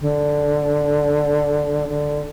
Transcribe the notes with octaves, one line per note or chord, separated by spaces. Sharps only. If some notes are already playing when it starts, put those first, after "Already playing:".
D3
D3